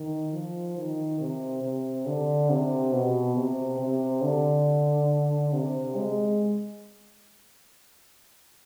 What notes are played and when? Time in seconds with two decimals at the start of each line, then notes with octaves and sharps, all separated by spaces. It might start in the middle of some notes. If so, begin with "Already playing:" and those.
Already playing: D#3
0.33 F3
0.77 D#3
1.20 C3
1.64 C3
2.06 D3
2.50 C3
2.92 B2
3.37 C3
3.80 C3
4.23 D3
5.53 C3
5.96 G#3